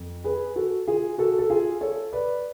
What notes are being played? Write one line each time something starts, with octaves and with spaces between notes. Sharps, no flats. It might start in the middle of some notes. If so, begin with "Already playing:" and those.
Already playing: F2
G#4 B4
F#4 A4
F4 G#4
F#4 A4
A4
F4 G#4
A4 C#5
B4 D5